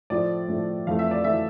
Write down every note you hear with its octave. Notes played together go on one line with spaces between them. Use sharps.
A2 F3 A3 D5
A2 F3 A3
F2 E3 A3 F5
E5
D5
E3 A3 E5